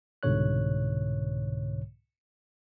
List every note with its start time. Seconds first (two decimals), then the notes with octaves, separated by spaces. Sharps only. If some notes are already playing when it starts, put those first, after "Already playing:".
0.23 C2 G#2 B2 D3 C#5 F#6